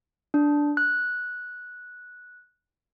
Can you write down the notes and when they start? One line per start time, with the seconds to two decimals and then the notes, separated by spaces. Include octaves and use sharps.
0.34 D4
0.77 F#6